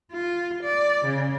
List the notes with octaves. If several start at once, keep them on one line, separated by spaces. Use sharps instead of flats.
F4
D5
C#3